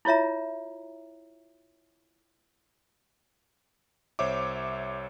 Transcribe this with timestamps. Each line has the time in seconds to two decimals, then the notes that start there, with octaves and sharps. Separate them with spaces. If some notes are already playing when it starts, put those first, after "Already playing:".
0.05 E4 F4 C#5 E5 A#5
4.19 C2 C5 C#5 E5 D6